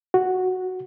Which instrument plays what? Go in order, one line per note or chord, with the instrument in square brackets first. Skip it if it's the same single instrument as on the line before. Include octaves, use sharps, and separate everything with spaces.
[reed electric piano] F#4